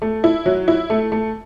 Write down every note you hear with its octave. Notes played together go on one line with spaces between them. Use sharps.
A3
E4
F#3
E4
A3
A3